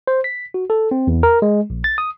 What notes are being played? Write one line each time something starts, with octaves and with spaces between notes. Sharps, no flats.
C5
B6
F#4
A4
C4
E2
A#4
G#3
A#1
A6
D#6